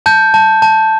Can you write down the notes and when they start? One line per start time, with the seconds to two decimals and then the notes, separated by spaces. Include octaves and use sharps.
0.06 A5 G6
0.34 A5
0.62 A5